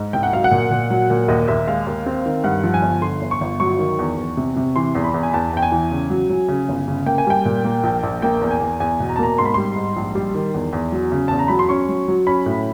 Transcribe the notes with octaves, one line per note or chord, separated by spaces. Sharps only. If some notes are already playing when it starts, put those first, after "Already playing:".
Already playing: G#2
C2 G5
F#5
F#3 F5
F#5
A#2
A#2
F#3
A#2
D#2 D#5
D#2 E5
G#3 F5
D#2
C4
D#3
G2 F#5
F3
G#5
G1
D3 C6
G1
C#6
G1
F#3 C#6
D#3
E2
E2
C3
C3
E3 C6
E2
B5
E2
G#5
E2 A5
E2 G5
G#5
E3
C#3
F#3
F#3
C#3
G1
C#3
A#3 G5
G#5
G3 G5
A#2
A#3
A#1
A#1
A#3 G5
E2
G#5
E2
E2 G#5
B2
A#5
A5
A#3 A#5
G#2 C6
B5
G3 C6
G#2
A#1
G3
D#3
E2
E2
F#3
C#3
E2 A5
A#5
F#3 B5
C6
C#4 C#6
F#3
F#3
C#4 B5
A2